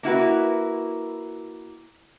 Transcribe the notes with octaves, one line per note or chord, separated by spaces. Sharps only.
A#3 E4 F#4 B4